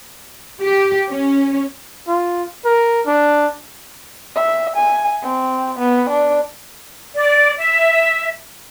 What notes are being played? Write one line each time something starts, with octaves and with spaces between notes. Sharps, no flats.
G4
C#4
F4
A#4
D4
E5
G#5
C4
B3
D4
D5
E5